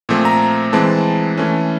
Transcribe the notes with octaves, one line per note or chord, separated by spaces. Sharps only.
A#2 F3 A3 C4
A#5
E3 G#3 C4 A5
E3 A3 C#4